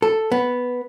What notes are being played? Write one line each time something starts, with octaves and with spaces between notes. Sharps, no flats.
A4
B3